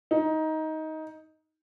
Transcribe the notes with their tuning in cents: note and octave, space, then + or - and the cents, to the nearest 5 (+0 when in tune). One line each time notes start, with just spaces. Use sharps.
D#4 +15